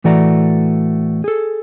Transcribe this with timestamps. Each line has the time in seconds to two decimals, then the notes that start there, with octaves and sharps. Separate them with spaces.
0.04 A2 E3 A3 F#4 D5 A#5
1.24 G#4 A4